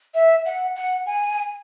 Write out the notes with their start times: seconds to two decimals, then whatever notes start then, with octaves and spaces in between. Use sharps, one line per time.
0.14 E5
0.45 F#5
0.76 F#5
1.06 G#5